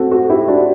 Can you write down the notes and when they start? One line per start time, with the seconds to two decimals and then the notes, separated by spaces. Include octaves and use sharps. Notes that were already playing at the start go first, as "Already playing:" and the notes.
Already playing: A3 C4 F#4 A4
0.11 F#4 A4
0.29 E4 G4
0.48 D4 F#4